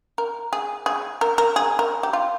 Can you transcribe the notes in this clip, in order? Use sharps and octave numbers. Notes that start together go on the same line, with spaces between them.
A#4
G#4
G#4
A#4
A#4
G#4
A#4
G4
F4